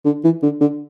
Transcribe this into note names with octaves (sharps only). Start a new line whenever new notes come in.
D3
E3
D3
D3